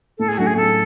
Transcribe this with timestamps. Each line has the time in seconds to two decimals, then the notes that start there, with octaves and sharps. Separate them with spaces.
0.18 A2 A4
0.28 G#4
0.38 F#3 A3 D4 F#4
0.47 G#4
0.56 A2 A4